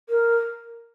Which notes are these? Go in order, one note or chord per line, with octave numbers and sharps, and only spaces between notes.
A#4